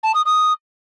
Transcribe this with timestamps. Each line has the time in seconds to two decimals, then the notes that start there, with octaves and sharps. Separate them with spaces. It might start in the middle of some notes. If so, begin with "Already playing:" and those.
0.03 A5
0.14 D#6
0.25 D#6